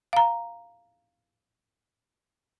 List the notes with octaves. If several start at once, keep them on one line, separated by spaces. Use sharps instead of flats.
F5 A#5